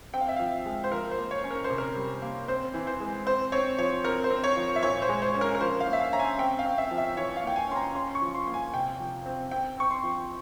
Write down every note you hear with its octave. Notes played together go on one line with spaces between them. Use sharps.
C4 G5
F5
E5
F3 F5
G#3
C5
F3 A#4
C5
A#3
C#5
C#4
A#4
C5
C3
A#4
G3
A#3
C4 C5
E3
C5
G#3
C4 C5
C4 C#5
F3 C#5
C4 A#4
C5
C4
C#5
F3
E5
A#2 C#5
C5
G#3
C5
C#4
A#4
A#4
F3 C5
F5
A#3
E5
F5
C#4 A#5
G#5
C4 G5
F5
C4
E5
F3
E5
E3 C#5
F5
A#3 G5
G#5
C#4 C6
A#5
C#4 C6
C#6
F3
C6
A#3
G#5
C3 G5
F3
C4
C4 G5
C4 C#6
C6
F3